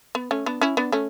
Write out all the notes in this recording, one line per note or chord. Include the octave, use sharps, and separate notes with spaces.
B3
A3 C#4
B3 D4
C#4 E4
B3 D4
A3 C#4